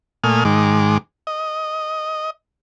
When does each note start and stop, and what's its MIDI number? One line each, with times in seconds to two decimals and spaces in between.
0.24 0.44 46
0.24 0.44 57
0.24 0.44 80
0.24 0.44 87
0.24 0.44 89
0.45 0.98 44
0.45 0.98 51
0.45 0.98 56
0.45 0.98 86
1.27 2.30 75